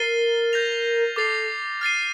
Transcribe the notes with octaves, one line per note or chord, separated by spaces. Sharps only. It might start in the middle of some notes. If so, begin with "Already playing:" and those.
Already playing: A#4 F6 A6 C7 D#7 G7
G6 A#6 F7
A4 D6 A6 C7 F7
F6 A6 C7 D#7